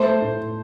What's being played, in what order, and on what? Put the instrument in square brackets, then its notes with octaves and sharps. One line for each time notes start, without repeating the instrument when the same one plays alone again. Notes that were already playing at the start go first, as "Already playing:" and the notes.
Already playing: [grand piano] A3 [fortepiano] C5
[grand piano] A2